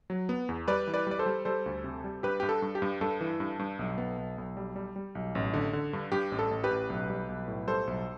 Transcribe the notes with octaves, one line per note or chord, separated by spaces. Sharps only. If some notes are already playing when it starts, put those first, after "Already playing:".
F#3
B3
E2
G3 B4 D5
E3
B4 D5
G3 D5
A4 C5
G3
G3 A4 C5
D2
C3
G3
G2 G4 B4
G2 G4
A4
G2
G4
G2
G2 A4
E3
G2
G2
B1
B3
B1
B1
G3
G3
G3
B1
A1
D3
D3
G2
G2 G4
A1
A4
A1
G4 B4
A1
B1
G3
B1
A2
G3 A4 C5
B1